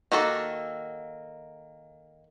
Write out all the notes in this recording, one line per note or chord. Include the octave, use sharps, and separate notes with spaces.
D#3 A#3 F#4 A4